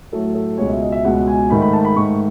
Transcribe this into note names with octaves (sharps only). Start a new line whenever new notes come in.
A2 F#3 A3 A4
A4
C#2 B2 G#3 C#5
E5
D#5
E5
C#2 B2 G#3 F#5
G#5
G#2 D#3 A3 B5
B5
A5
B5
G#2 D#3 A3 C#6